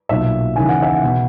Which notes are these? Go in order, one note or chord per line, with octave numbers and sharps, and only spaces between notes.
B1 A#2 E5
D#2 C#3 E3 G#5
F#5
E5
F#5
B2